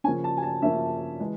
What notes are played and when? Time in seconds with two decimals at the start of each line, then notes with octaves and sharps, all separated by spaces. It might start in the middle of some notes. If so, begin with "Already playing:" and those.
0.04 C#3 F3 A#3 C#4 G#5
0.24 A5
0.37 G#5
0.43 A5
0.62 C#3 F3 A#3 C#4 E5
1.20 E3 G#3